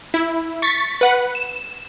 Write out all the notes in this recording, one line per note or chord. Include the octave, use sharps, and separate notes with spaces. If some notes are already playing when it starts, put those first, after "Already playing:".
E4
C#6 A6 B6
B4 F#5
E7